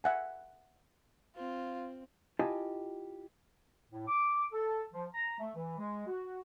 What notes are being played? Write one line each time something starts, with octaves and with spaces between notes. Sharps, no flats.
E5 F#5 G#5
C4 F4
E4 F4 G4 D#5 G#5 A5
A2
D6
A4
F3
A#5
A3
E3
G#3
F#4